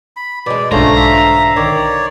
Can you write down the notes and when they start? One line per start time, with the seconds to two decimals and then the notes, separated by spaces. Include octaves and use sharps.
0.16 B5
0.46 B2 G#3 D5
0.72 B1 G#2 D3 A3 C#4 F4 C5 A#5
0.96 E5 F5
1.56 D#3 C#5 D5